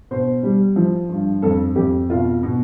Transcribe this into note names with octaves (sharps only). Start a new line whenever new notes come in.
B2 C5
G3
F3
G2
F2 A4
F2 G4
B2 F4
B2